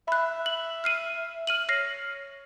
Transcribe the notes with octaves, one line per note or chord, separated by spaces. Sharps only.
E5 B5 F#6
F#7
F6 C7 D#7
F6 D#7 F#7
C#5 F6 A#6 C7